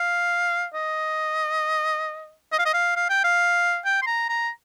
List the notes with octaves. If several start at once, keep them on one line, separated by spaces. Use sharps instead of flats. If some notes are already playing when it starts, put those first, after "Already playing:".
Already playing: F5
D#5
D#5
F5
D#5
F5
F5
G5
F5
G5
C6
A#5
A#5